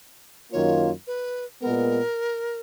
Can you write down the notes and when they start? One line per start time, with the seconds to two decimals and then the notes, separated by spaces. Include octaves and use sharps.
0.52 F#2 D#3 A#3 F4 C#5
1.07 B4
1.62 A#2 G#3 B3 A#4